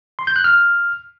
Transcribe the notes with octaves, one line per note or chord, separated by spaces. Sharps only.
C6
G6
F#6
F6